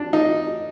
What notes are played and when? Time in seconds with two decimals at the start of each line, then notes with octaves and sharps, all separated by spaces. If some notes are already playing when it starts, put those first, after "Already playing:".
Already playing: D4
0.13 D#4